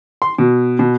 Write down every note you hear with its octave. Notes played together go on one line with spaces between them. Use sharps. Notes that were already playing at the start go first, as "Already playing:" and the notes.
C6
B2
B2